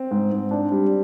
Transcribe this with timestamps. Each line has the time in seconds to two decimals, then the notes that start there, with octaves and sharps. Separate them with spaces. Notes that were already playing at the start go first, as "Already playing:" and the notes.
Already playing: C4
0.11 G#2
0.32 G#2
0.51 D4
0.72 G3